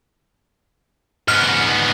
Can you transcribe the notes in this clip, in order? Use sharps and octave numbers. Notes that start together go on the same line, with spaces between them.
G#2 B3 F6